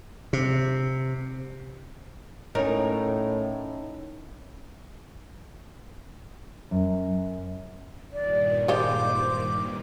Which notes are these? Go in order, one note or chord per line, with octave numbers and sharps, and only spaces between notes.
C3
A2 C#4 D#4 A#4 C#5
F#2
G2 A#2 D#3 D5
G3 G#3 F4 C5 D6